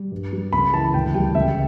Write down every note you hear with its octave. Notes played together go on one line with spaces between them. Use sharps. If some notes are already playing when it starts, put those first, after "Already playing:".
Already playing: G3
G2
G3
C#2 B5
E3 A5
D2 G5
G3 G5
C#2 E5